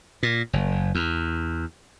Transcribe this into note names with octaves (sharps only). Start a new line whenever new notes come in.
A#2
F#1
E2